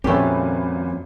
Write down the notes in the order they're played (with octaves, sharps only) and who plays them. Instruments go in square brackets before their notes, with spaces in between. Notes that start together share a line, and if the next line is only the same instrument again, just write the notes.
[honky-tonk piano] G#1 A#2 B4 [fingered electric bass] F2 C4 [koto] A3 G4 [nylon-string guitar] C#4